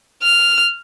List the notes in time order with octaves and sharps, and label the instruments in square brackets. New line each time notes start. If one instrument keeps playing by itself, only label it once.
[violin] F6